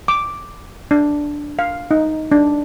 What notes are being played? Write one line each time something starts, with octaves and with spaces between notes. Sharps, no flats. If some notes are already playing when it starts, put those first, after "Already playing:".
D6
D4
F5
D#4
D4